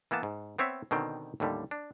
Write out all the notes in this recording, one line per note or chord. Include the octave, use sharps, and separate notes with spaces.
E3 A#3 B3 A5
G#2
B3 C4 C#5 E5
B2 D3 D#3 C4 G5
D#2 A2 D3 G3
D4